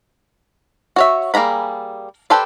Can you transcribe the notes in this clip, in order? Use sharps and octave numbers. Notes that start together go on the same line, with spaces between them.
F#4 C#5 E5
G3 A#3 G#4 A#5 B5
G4 A4 B4 C5 D5